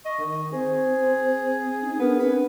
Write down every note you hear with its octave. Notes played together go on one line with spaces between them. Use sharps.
D#5 C#6
D#3
C4 G#4 C5
C#4 D#4
B3 D4 A#4
C4 B4